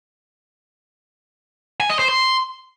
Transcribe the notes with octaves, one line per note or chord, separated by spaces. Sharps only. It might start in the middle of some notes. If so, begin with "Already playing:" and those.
G#5
D#5
C5
C6